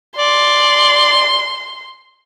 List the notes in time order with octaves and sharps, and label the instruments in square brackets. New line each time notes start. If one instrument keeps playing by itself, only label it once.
[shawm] D5 [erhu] C6